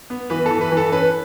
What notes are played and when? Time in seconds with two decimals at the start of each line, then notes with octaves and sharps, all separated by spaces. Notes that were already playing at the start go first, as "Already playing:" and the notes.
0.10 B3
0.30 E3 B4
0.46 E3 A4
0.61 B4
0.72 E3
0.77 A4
0.92 C#4 B4